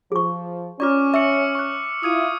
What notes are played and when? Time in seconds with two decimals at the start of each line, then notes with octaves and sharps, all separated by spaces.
0.12 F3 G#4 C#6
0.80 C#4 F4 D5 C#6 D6 F6
1.14 E5 C#6 E6 C#7
1.55 C#6 F#6
2.03 E4 F4 D#6 G#6 D#7